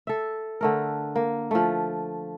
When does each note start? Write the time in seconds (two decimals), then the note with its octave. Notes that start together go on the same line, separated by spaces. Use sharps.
0.07 A4 E5
0.61 D3 A3 A#4
1.16 A#3
1.51 F3 A3